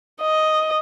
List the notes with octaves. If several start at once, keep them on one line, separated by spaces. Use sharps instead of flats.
D#5